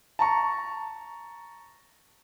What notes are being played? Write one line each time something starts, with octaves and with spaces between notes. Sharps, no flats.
A5 A#5 C#6